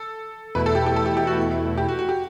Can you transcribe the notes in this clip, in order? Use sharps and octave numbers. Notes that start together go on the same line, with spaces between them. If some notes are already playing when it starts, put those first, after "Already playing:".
Already playing: A4
E2 B2 A3 E4 B4
A4
G4
G4
A4
G4
G4
F#4
G4
F#4
F#4
G4